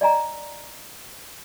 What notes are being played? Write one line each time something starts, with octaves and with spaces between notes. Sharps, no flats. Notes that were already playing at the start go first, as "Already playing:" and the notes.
D5 D#5 G#5 A#5